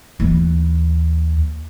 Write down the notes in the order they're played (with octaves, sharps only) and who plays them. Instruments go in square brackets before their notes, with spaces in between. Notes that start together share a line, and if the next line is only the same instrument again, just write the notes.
[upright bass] D#2 E3